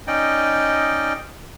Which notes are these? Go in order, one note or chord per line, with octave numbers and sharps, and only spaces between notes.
C#4 D#4 D5 D#5 G5